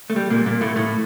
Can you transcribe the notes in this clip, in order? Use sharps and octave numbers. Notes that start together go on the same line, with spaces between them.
A3
G3
A#2 A#3
A#2 A#3
A2 A3
A2 A3